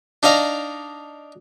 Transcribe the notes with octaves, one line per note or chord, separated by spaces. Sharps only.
D4 D#4 D5 F5 A#5